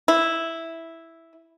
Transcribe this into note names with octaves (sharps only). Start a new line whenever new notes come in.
E4